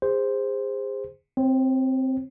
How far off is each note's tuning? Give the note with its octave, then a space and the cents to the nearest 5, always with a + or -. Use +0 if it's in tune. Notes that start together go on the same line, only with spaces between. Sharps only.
G#4 -35 C5 +0
C4 +0 C#5 -40